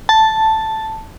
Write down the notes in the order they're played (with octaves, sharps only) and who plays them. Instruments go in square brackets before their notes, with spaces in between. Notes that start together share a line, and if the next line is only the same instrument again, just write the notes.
[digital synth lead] A5